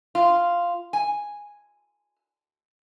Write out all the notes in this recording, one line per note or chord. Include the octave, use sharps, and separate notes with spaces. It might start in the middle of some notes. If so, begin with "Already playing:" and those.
F4
G#5